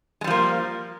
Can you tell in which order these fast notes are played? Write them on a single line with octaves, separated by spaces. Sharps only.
G#3 G3 F3 A#3